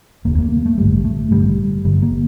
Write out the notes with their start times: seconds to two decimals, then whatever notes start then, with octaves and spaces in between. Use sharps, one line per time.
0.25 F1 D#2 D3 A#3
0.38 A#3
0.52 A#3
0.66 A3
0.78 A1 G2 D3 G3
1.05 A3
1.31 A1 G2 D3 G3
1.84 G1 G2 D3 G3
2.02 A#3